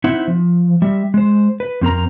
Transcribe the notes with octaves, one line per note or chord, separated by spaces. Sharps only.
C4 D#4 E4 C5 E5 F#5
F3
G3 E5
G#3 C5
B4
F2 C4 A#4 A#5